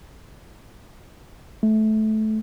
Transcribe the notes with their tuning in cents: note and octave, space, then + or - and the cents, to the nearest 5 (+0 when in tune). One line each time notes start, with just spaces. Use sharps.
A3 -20